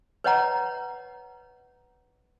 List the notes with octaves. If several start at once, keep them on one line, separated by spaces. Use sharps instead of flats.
B4 C#5 D#5 F#5 A#5